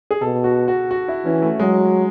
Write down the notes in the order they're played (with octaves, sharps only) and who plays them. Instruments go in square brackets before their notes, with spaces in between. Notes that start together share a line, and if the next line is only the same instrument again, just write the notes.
[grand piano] G#4
[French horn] B2 [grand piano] A4
[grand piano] F#4
F#4
F#4
E4
[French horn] E3 [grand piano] C#4
[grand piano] A3
[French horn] F#3 [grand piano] G#3